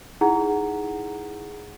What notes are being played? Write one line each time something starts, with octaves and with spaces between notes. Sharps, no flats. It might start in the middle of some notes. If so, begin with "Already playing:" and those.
D#4 E4 G#4 F#5 A#5